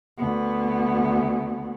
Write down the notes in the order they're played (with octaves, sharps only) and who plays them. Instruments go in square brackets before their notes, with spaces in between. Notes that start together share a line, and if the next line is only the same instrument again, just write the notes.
[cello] D2 B3